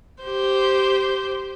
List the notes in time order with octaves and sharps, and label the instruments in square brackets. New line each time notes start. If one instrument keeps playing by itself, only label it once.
[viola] G4 C5